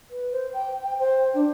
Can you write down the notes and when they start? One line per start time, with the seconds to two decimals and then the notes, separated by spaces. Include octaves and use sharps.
0.10 B4
0.32 C5
0.54 G5
0.83 G5
0.99 C5
1.34 D4